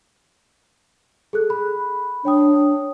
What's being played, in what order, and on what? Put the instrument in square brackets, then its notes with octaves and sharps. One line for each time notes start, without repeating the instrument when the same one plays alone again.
[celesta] G#4 A4 F#6
B5
[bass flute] D4 [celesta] C#5 G5 D#6